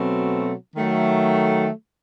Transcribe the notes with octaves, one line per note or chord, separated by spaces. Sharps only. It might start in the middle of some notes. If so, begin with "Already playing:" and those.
Already playing: B2 F#3 A3 C4
D#3 F#3 A3